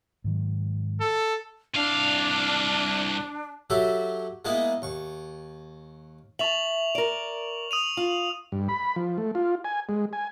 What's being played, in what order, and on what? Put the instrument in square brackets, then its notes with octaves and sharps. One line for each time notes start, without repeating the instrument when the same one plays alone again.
[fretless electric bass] G#2 D#3 F#3
[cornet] A4
[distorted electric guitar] C2 F5 [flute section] D4
[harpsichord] F#3 F#4 G4 A4 E5
G#3 A#3 B3 D#4 E4
D#2 C#6
[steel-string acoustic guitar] E5 A5 [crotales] C#6 F7 F#7
[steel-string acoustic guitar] A#4 D5
[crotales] D#6 D#7 F7
[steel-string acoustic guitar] F4
[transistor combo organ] G2
B5
F3
A3
F4
G#5
G#3
G#5